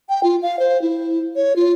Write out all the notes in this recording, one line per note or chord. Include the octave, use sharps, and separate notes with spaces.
G5
F4
F5
C5
E4
C#5
F4